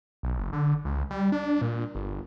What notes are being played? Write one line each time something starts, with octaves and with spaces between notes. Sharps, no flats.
B1
F#1
D3
C#2
G3
D4
A#2
G1